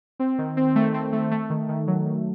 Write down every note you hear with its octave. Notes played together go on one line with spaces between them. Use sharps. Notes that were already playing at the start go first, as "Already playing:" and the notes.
C4
D#3
C4
A3
C4
A3
A3
D#3
D#3
F#3
D#3